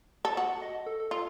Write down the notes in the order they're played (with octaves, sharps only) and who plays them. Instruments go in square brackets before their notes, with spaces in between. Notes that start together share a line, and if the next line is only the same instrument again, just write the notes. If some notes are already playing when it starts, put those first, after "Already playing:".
[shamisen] A4
[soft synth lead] A5
[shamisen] F#4 [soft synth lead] F#5
[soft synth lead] F#5
D#5
A4
A4
[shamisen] F4 [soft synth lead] A4